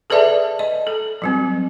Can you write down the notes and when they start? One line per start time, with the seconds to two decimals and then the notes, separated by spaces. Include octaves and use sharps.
0.10 G#4 A4 B4 D5 E5 A5
0.59 D#5
0.87 A4
1.22 F#3 G3 C4